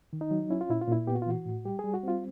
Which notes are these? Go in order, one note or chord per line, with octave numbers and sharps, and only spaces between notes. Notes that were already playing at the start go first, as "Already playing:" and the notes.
D#3
D#4
F#3
C#4 E4
F4
A#2 E4
F4
A#2 E4
B3 G4
F#4
F4
E3 F#4
A2
G3 G4
G3 G#4
F#4
C4 F4